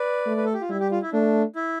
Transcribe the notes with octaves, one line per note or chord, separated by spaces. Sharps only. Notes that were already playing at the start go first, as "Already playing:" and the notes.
Already playing: B4 D5
A3
B4
A4
G4
F4
G3 E4
G4
F4
E4
A3 D4
E4